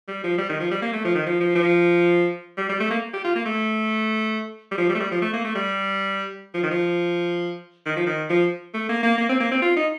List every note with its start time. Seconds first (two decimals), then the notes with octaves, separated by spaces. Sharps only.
0.08 G3
0.24 F3
0.38 G3
0.49 D#3
0.60 F3
0.71 G3
0.82 A#3
0.93 A3
1.05 F3
1.15 D#3
1.27 F3
1.40 F3
1.55 F3
2.58 G3
2.69 G3
2.80 A3
2.91 A#3
3.13 G4
3.24 F4
3.35 A#3
3.46 A3
4.71 G3
4.78 F3
4.89 G3
4.95 A3
5.00 G3
5.11 F3
5.22 A3
5.34 A#3
5.44 A3
5.55 G3
6.54 F3
6.63 D#3
6.71 F3
7.86 D#3
7.96 F3
8.07 D#3
8.30 F3
8.74 A3
8.89 A#3
9.03 A#3
9.18 A#3
9.29 C4
9.40 A#3
9.51 C4
9.62 F4
9.77 D#4